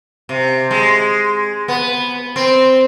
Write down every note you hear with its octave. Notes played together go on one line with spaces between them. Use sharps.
C3
G#3
B3
C4